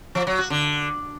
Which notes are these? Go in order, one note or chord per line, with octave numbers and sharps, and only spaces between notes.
F3
F#3
F#4
D3